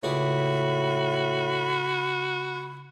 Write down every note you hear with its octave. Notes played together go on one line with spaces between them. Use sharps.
C#2 A2 F#4 G#4 D5 B5